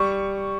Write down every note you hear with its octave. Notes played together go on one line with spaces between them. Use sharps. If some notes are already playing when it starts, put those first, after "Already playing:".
Already playing: G3 C#6